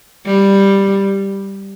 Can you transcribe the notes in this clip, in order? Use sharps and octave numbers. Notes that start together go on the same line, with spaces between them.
G3